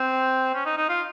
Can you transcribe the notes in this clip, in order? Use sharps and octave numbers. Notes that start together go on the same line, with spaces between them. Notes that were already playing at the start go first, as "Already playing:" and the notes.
Already playing: C4
C#4
D#4
D#4
F4